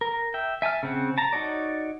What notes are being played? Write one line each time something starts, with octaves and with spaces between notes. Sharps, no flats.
A#4
E5 G5
E5 G#5 A5 F6
C#3 C4 F#5
A5 A#5
D#4 F#4 C#5 D5